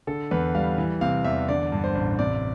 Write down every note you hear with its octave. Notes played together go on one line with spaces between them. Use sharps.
D3 A4
E2 B4
G3 F5
E3
C3 F5
E2 E5
D3 D5
G2
C5
A1
C3 D5